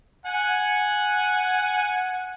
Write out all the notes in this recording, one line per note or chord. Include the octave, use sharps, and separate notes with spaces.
F#5 G#5